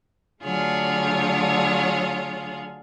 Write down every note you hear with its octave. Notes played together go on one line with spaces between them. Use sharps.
D3 F#3 A3 F4 G#4 C#5